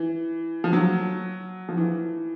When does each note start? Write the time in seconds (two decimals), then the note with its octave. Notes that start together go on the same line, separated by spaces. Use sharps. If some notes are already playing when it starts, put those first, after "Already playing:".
Already playing: E3
0.64 F3
0.73 F#3
1.69 F3
1.77 E3